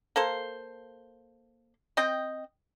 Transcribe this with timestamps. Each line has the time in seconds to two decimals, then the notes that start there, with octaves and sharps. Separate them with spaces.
0.16 A#3 A4 C5
1.97 C4 D#5 G5